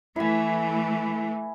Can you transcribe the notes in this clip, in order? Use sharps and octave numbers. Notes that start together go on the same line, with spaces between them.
E3 A3 E4 G#5